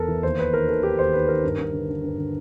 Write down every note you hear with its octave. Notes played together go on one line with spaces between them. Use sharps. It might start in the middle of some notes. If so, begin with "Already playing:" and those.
Already playing: E2 A4 A#4
E3
D#2 C5
D#2 B4
D#3 A#4
D#3 A4
D#3 G4
D#2 C5
D#3 B4
D#3 A#4
G2
G2
D3
D3
G2
D3